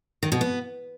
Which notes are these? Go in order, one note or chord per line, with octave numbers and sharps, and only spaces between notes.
D#3
B2
B3